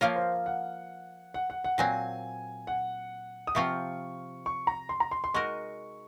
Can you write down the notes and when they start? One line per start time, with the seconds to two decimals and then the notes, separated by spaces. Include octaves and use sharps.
0.01 F3 A#3 F4 A#4 C#5
0.16 C5
0.46 F#5
1.34 F#5
1.50 F#5
1.64 F#5
1.78 A#2 F#3 C4 G#5
2.67 F#5
3.47 D#6
3.55 C3 F3 C4 F4 C#6
4.46 C#6
4.67 A#5
4.89 C6
5.00 A#5
5.11 C6
5.24 C6
5.34 G#3 D#4 F#4 A#4 C#6